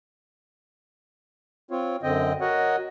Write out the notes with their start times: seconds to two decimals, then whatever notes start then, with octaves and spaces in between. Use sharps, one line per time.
1.71 C4 F4 C#5
2.03 F#2 D3 C4 D#5 G5
2.41 F#4 A#4 C#5 D#5 F#5